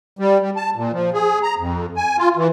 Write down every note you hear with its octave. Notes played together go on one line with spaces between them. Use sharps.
G3
G3
A5
A#2
F3
G#4
A#5
F2
G#5
F4
E3